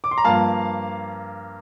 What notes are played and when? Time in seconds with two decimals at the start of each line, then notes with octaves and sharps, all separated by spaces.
0.04 D6
0.11 C6
0.18 A#5
0.24 G2 F3 A#3 F5 A5